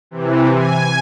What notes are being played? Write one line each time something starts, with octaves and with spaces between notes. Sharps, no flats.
C3 E3
G#5